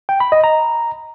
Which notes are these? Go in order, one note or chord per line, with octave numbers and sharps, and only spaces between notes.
G5
B5
D#5
A#5